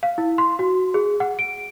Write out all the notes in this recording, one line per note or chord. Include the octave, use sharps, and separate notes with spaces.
F5
E4
C6
F#4
G#4
F#5
D7